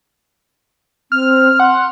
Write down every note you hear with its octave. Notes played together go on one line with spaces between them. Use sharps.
C4 F6
F#5 C6